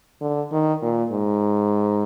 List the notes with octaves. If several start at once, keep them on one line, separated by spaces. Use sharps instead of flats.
D3
D#3
A#2
G#2